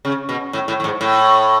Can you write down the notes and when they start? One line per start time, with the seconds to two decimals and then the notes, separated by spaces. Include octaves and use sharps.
0.05 C#3
0.29 B2
0.53 A2
0.68 A2
0.80 A2
0.84 G#2
1.01 A2